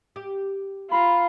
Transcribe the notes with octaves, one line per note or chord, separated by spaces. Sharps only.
G4
F4 A#5 B5